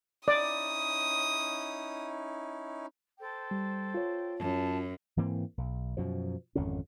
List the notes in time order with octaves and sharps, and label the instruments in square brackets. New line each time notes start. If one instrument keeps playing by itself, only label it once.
[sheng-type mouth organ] C#4 D#4 E4 [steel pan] D5 [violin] D#6
[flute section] A4 C5 G5
[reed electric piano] G3
F4 C#5
[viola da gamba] F#2 [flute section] A5
[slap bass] G#2 E3 A#3 C4
B1
F#2 B2 F3
G#1 F2 D3 C#4